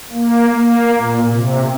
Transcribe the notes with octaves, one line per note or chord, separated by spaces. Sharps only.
A#3
A#3
A#2
C3